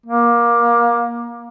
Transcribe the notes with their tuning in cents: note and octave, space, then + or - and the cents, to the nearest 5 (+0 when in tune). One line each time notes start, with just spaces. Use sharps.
A#3 +20